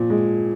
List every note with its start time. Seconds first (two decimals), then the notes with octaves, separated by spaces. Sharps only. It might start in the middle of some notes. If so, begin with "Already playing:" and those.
Already playing: A#2 F3
0.10 G#3